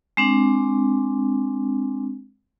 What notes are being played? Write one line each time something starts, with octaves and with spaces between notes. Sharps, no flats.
G#3 C4 D4